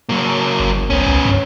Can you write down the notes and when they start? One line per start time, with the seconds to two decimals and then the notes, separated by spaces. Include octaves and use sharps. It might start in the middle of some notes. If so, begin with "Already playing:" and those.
0.09 F#3 A#3
0.60 G1
0.90 C2 B3 C#4
1.06 C2
1.25 G2